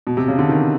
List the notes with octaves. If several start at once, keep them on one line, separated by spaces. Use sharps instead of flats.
B2
C3
C#3
D3
D#3